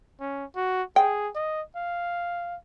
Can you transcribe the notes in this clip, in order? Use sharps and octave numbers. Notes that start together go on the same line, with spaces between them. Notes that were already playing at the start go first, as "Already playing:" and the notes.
C#4
F#4
G#4 G5
D#5
F5